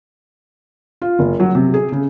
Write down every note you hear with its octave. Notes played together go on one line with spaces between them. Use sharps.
F4
F#1
F#3
C3
G#4
C#3